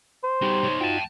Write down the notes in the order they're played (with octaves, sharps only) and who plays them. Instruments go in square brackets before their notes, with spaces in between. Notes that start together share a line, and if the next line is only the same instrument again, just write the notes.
[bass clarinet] C5
[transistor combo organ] G3 G4 [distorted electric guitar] D#4 F#4
[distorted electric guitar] D#4 C#5
[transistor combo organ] D#4 F4 F#4 [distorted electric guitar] G5 A5